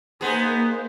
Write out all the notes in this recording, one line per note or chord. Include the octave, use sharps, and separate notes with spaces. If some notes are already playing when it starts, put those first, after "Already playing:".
A#3 B3 D#4 G#4 C5